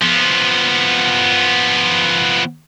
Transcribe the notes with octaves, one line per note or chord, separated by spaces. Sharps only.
F3 B3